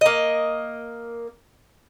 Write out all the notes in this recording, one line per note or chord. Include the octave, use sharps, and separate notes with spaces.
A#3 D#5